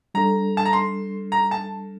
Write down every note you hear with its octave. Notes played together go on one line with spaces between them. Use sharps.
G3 D4 A4 A#5
A5
A#5
C6
A#5
A5